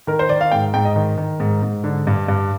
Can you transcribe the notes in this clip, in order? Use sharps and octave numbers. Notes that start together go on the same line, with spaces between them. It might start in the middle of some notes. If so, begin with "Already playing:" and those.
D#3 A#4
C5
D#3 D5
F5
G#2 G5
G#2 G5
D#5
D#3
D#3
G#2
G#2
D3
G2
G2